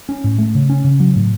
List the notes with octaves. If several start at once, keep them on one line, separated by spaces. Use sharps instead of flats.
C#4
A2
A3
C#3
C#4
C#3
F#3
A2